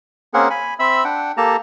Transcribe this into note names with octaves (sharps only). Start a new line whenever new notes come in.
A#3 C4 C#4 G#4 A#4 F#5
G#5 B5
C4 E5 B5 E6
D4 F#5 G5
A#3 G4 A4 A5 A#5